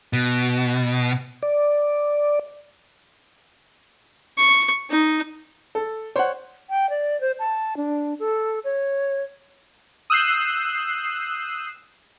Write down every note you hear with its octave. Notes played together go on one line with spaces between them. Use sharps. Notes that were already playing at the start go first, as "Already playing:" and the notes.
B2
D5
C#6
D#4
A4
C5 C#5 F#5
G5
D5
C5
A5
D4
A4
C#5
D#6 E6 F#6 G6 C7